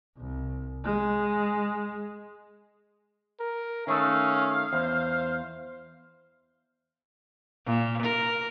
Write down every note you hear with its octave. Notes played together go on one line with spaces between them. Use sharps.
C2
G#3
A#4
D#3 A3 C#4 F5
E2 C5
A#2
A#4